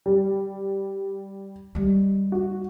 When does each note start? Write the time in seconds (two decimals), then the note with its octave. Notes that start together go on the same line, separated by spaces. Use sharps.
0.06 G3
1.75 G3 G#3
2.32 F#4